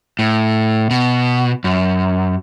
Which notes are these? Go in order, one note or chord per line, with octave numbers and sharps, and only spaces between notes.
A2
B2
F#2